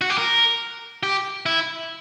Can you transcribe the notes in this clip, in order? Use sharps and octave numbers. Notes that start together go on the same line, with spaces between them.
F#4
G4
A#4
G4
E4